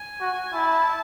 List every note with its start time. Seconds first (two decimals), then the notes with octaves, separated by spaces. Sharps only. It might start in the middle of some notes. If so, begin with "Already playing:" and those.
Already playing: G#5
0.21 F#4
0.53 E4 A5